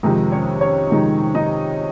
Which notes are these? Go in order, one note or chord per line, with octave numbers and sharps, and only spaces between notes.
F2 C3 D#3 G#3 D#4
C#4 C#5
C#4 C#5
F2 C3 D#3 G#3 D#4
D#4 D#5